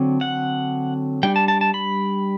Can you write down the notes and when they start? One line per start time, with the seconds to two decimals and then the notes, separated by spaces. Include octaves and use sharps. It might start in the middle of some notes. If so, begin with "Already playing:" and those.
Already playing: D3 F#3 C4
0.21 F#5
1.23 G3 D4 G5
1.36 A5
1.48 A5
1.61 A5
1.74 B5